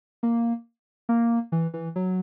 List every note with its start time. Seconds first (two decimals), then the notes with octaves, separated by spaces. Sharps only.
0.23 A#3
1.09 A#3
1.52 E3
1.74 E3
1.96 F#3